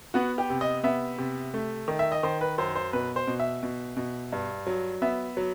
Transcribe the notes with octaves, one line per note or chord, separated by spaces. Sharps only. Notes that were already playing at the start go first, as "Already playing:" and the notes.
B3 F#4
G4
C3
D#5
B3 E5
C3
A3
D#3
E5
D#5
D#3 C5
B4
F#2 C5
C5
B2 B4
C5
B2
E5
B2
B2
G2
F#3
B3 E5
F#3